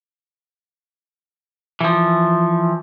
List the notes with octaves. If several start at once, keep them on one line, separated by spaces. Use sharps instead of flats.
E3 F3